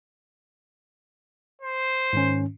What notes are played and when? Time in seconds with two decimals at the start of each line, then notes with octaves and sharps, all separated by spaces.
1.62 C5
2.13 G#2 D#3 C#4